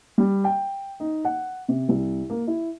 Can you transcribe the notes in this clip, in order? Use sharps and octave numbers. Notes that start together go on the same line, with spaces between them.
G3
G5
D#4
F#5
C3
C2
A#3
E4